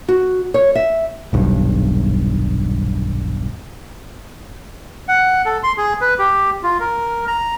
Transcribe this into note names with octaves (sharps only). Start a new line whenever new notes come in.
F#4
C#5
E5
D#1 B1 G2
F#5
A4
C6
G#4
B4
G4
F4
A#4
A#5